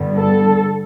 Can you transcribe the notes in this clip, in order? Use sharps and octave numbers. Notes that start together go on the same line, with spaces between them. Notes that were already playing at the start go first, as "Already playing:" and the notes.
Already playing: G2 D3 G3 B3
A4